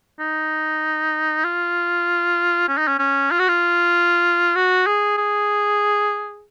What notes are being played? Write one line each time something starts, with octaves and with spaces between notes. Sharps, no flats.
D#4
F4
C#4
D#4
C#4
C#4
F4
F#4
F4
F#4
G#4
G#4